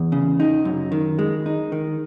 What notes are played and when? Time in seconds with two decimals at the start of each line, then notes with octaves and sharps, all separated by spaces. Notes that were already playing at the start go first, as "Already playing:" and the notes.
Already playing: E2
0.12 C#3
0.40 D#4
0.65 F#2
0.92 D#3
1.19 G#3
1.46 D#4
1.72 D#3